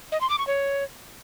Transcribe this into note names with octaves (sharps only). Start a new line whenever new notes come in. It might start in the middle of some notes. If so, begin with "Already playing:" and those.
D#5
C6
D6
C#6
C#5